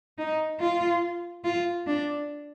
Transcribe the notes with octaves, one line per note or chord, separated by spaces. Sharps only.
D#4
F4
F4
D4